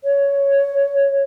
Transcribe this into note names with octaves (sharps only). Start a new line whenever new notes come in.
C#5